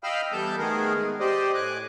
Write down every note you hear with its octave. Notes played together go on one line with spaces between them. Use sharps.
D#5 F5 G5 B5 E6 F6
E3 G3 B3 A4 A5 G6
D#3 A3 B3 G#4 A#4
G#3 B3
G4 C5 D5 D#5
A2 G#5 D6 F#6